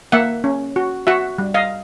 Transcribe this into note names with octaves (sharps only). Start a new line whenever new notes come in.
A#3 E5 F#5
C#4
F#4
F#4 E5 F#5
G3
D#5 F5